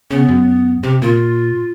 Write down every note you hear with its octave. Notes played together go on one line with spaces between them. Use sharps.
C#3 B3
F#2
C3 G4
A#2 F4